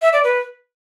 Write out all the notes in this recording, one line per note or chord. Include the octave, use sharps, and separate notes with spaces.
E5
D5
B4